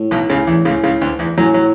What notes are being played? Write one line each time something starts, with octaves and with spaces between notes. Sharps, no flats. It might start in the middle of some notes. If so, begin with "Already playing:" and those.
Already playing: A2
B1 B2
C#2 C#3
E2 E3
C#2 C#3
C#2 C#3
D2 D3
E2 E3
F#2 A2 F#3
F#3